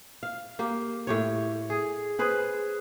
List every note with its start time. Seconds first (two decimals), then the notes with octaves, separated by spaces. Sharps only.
0.23 F5
0.59 A#3 G4
1.07 A2 G4 C#5
1.70 G#4
2.19 G#4 B4 C5